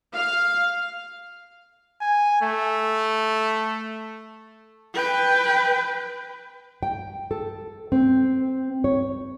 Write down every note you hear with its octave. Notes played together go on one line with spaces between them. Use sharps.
F5
G#5
A3
B4 G5
G5
A4
C4
C#5